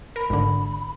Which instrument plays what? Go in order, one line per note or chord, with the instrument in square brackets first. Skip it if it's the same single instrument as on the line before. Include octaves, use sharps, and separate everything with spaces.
[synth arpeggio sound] A#4 [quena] B5
[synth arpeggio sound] G#1 D3